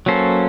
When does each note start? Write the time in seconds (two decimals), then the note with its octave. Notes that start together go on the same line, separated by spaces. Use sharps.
0.06 F#3 A#3 C#4 A4 C5